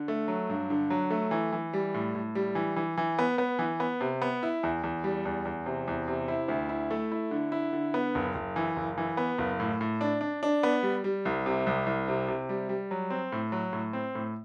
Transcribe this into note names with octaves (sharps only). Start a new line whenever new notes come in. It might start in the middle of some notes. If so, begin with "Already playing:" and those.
Already playing: D3
A3
F#3
G2
D3
F#3
A3
E3
E3
G3
A2
A2
G3
E3
E3
E3
B3
B3
E3
B3
C3
B3
E4
E2
E2
G3
E2
E2
C3
E2
C3
E4
D2
E4
A3
E4
D3
E4
D3
B3
F#1
F#1
E3
F#1
E3
B3
F#1
A2
A2
D4
D4
D4
B3
G3
G3
C2
C3
C2
C2
C3
C3
G3
G3
F#3
C4
A2
F#3
A2
C4
A2